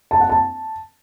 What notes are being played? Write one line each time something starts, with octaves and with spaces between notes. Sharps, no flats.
A5
F#5
A5